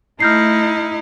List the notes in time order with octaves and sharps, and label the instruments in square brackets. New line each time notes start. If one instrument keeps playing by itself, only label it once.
[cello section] A3 [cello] D#4 E4 [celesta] F6 G6 C7